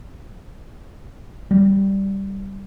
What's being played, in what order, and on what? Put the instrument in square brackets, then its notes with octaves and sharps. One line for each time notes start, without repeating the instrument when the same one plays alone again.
[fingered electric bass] G3